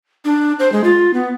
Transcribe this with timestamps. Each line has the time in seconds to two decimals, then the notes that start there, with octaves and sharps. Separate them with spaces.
0.25 D4
0.59 C5
0.72 G#3
0.84 F4
1.14 B3